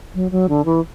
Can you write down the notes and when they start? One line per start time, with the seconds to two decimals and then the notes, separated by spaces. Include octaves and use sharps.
0.14 F#3
0.31 F#3
0.49 D3
0.65 E3